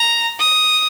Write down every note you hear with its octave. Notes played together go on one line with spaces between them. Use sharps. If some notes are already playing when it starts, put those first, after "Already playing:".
Already playing: A#5
D#6